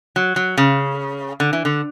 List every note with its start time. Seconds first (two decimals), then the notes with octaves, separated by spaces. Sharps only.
0.16 F#3
0.36 F#3
0.58 C#3
1.40 D3
1.53 E3
1.65 D3